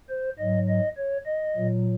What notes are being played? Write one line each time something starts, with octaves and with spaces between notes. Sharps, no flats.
C5
G#2 F#3 D#5
D#5
C#5
D#5
A#2 F#3